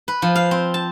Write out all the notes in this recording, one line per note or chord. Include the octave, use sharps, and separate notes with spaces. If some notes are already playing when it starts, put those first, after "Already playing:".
B4
F3
F5
C4
A5